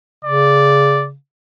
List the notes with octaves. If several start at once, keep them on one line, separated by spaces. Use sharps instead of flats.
C#3 D5